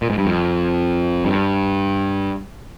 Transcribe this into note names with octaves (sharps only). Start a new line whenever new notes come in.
A#2
G#2
G2
F2
G2